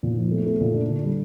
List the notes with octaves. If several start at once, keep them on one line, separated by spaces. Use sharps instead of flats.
A#2
F3
A3
A3
A#2
D4
D3
G3